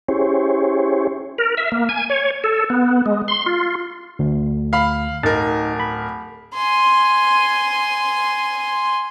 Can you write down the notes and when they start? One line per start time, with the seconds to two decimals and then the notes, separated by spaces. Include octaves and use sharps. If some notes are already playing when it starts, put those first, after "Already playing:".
0.09 C#4 E4 G4 G#4 C5 C#5
1.38 A#4
1.57 E5
1.72 A#3
1.89 G#5
2.10 C#5
2.44 A4
2.70 B3
3.06 G#3
3.28 C6
3.46 F4
4.19 D2
4.73 F5 B5
5.23 D1 D#4 A#4 A6
5.80 B5
6.54 G#5 C6